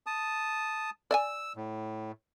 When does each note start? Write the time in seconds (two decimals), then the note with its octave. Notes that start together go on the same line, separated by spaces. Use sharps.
0.06 A5 D#6
1.11 D5 E5 G#5 E6
1.56 A2